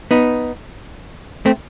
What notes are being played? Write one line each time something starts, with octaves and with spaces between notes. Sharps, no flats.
B3 D#4
A3 C4